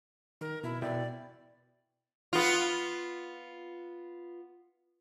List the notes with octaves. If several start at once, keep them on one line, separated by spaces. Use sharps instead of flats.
D#3 A#4
B2 E4
B2 E4 D5 G5
B3 F4